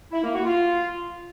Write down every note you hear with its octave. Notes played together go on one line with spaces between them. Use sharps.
E4
A#3
F#4
F4